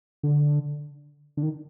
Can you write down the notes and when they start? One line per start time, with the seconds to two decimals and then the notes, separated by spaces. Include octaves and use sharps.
0.23 D3
1.37 D3
1.43 D#3